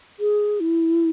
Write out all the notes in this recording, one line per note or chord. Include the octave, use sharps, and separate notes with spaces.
G#4
E4